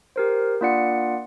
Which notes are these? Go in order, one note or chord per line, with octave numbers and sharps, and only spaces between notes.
G4 A#4 C5
A#3 D4 F4 D5 F#5 C#7